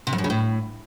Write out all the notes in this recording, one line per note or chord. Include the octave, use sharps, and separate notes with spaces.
C3
F2
F#2
C#3
A2